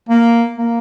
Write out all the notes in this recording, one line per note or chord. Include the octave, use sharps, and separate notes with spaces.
A#3
A#3